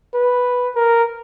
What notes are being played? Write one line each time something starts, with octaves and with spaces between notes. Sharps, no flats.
B4
A#4